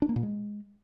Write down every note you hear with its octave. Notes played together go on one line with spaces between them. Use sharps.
D4
A#3
A#2
G#3